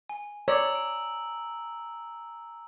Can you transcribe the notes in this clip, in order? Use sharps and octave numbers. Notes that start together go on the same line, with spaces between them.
G#5
C#5 D5 A#5 E6 F#7
D7